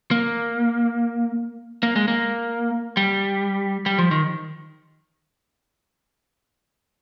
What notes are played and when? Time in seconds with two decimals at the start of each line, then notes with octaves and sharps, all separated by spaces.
0.11 A#3
1.83 A#3
1.96 G#3
2.08 A#3
2.97 G3
3.86 G3
3.98 F3
4.11 D#3